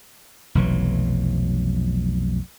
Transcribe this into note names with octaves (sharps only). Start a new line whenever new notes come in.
F1 B1 E3 F#3